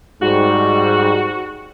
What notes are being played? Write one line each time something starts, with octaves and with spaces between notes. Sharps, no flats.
G#2 G3 F#4